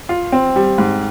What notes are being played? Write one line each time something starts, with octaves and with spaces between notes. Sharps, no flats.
F4
C4
G3
G#2